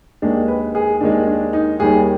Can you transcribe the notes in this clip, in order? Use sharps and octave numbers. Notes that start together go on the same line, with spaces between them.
D#2 D#3 G#3 D4
B4
G#4
D#2 D#3 G#3 D4
D4
D#4
D#2 D#3 G3 G#4